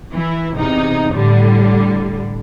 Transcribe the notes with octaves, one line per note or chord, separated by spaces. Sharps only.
E3 E4
E2 C3 D#4
A2 D3 G3